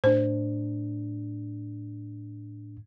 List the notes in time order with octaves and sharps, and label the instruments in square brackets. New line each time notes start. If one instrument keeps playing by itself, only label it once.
[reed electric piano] A2 D4 [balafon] C5